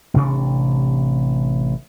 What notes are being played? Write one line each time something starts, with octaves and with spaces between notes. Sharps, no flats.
A1 C3 D4